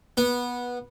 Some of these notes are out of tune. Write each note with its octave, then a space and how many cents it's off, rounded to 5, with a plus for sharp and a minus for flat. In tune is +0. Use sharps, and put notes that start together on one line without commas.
B3 -15